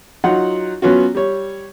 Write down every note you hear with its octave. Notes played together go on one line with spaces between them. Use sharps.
F#3 D#4 F4 F#5
F#3 B3 C#4 F4 F#4
G3 C#5